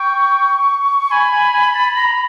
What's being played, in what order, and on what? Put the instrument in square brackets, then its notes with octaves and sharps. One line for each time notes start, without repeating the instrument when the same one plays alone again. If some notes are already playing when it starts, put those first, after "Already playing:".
Already playing: [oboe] G5 [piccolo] C#6
[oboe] G#5 [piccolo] B5
[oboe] G#5
G#5
A5
A#5